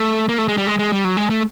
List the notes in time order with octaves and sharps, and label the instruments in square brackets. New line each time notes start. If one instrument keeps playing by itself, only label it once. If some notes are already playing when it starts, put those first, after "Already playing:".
Already playing: [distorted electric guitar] A3
A#3
A3
G#3
G3
G#3
G#3
G3
F#3
G#3
A3